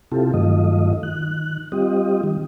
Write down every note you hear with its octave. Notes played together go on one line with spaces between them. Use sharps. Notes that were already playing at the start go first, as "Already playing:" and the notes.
C3 C4 E4 F4 G4 A4
G2 D#3 F#3 A3 F4 D#5
D#3 F#6
G3 C4 F4 G4 D#5
D#3 G3